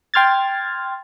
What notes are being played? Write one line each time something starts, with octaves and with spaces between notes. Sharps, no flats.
G5 C6 F6 G#6 A6